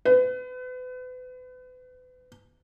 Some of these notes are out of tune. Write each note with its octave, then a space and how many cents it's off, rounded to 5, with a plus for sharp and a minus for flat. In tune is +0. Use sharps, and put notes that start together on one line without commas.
B4 +35